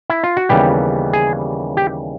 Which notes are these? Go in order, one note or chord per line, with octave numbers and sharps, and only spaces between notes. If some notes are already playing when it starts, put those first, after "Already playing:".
E4
F4
F#4
D#2 C#3 E3 G3 B3 G4
G#4
G4